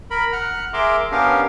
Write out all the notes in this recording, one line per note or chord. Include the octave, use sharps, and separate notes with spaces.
A#4 B5
F#5 F6 F#6
G#4 A#4 E5 A#5 C6 D6
B3 C#4 D4 G4 A#4 F5